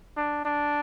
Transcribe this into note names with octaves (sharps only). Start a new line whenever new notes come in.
D4
D4